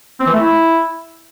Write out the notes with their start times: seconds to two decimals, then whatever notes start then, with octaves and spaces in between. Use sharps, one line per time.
0.20 C4
0.26 E3
0.33 A3
0.39 E4